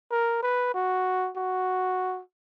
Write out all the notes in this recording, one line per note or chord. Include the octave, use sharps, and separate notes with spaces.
A#4
B4
F#4
F#4